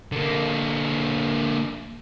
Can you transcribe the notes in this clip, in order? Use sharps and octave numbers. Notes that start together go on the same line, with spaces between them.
D3 A#3